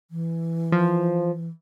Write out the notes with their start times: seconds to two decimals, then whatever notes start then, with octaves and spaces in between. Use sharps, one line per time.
0.11 E3
0.72 F3